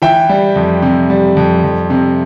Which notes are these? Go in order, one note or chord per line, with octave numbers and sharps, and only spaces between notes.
E3 E5 G5
G3
F2
C3
G3
F2
F2
C3